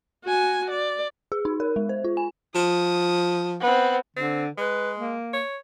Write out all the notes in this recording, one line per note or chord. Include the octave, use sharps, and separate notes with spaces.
F#4 G#5
D5
G#4
D#4
A#4
G#3
C5
F4
G#5
F3 D#6
B3 C4
D3 C4
G#3 B4
A#3
C#5